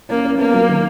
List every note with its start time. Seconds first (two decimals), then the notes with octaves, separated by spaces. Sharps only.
0.09 A#3 C#4
0.25 C#4
0.39 A#3 B3
0.54 F#3
0.69 D#3